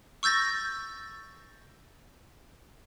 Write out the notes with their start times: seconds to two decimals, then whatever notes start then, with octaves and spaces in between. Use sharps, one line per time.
0.23 C#6 E6 G6 A6 A#6